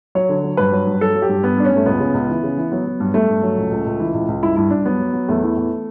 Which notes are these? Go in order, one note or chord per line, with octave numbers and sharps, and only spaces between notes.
F#3 C#5
D3
F#3
G2 B4
F#3
G2
F#3 A4
F#3
G4
G2
G2 B3
G2 D4
C#4
G2 A3
C#2 B3
C#3
C#2
E3
C#3
E3
F#3 B3
F#3
G2
G2 A3
G2
F#3
C#2
C#2
C#2
E3
C#2
C#2
G2 E4
G2 E4
G2 D4
F#3 B3
F#3
F#3
E2 A3
E3
E2